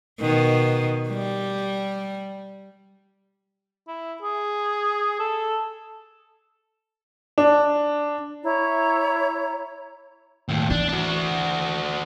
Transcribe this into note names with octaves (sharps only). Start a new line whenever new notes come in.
B2 D#3
G3
E4
G#4
A4
D4
E4 C#5 A#5
D#2 A2
E3 D4
D4 F#4